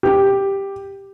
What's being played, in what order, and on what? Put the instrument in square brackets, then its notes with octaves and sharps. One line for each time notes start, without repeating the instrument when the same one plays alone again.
[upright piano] G4